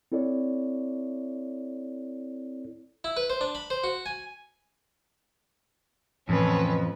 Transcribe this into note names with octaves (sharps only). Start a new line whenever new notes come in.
C4 E4 A4 C#5 D5
E4
B4
C5
D4
B5
C5
F#4
G#5
F1 F2 A2 E3 C#4 B4